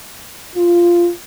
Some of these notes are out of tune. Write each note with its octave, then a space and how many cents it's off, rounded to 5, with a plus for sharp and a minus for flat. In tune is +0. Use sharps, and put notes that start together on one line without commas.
F4 -10